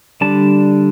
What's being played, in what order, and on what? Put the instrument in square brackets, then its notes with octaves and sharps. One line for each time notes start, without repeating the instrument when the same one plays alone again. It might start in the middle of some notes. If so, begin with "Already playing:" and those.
[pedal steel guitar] D3 G3 D4 A5